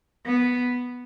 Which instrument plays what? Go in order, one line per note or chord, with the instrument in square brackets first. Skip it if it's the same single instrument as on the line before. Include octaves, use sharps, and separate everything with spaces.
[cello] B3